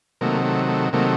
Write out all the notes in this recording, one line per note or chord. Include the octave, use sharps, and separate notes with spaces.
C3 D#3 F#3 A3 A#3
A3
A3
C3 D#3 F#3 A3 A#3